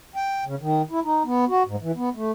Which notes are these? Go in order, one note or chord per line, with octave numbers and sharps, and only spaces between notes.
G5
C#3
D#3
E4
D#4
B3
F#4
G#2
E3
B3
A3